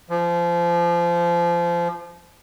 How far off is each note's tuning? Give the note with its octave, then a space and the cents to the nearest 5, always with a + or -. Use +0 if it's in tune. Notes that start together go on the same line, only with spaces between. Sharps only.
F3 -25